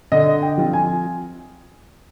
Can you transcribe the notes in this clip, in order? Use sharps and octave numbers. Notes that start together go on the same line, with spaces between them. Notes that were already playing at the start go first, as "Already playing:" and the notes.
D3 D#5
G5
F3 C4 F4
G#5